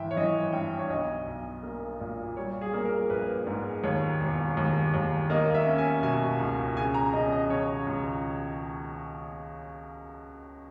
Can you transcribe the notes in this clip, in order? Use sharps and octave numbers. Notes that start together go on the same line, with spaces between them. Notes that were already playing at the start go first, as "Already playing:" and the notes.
Already playing: G#1 E3 E5 G5
C#5
E3 D#5
G2 G5
C#5
B1 D#5
B1
A#3
A#2
G3 C#5
G#4
A#3
A#4
A#1 B4
G#2
D#2 C#5
E1
D#2
D#2
A#3 D#5
E5
C#4
G#5
B2 G#5
C#2
C#3 G#5
A#5
C#3 D#5
D#5
C#3 C#5
C#2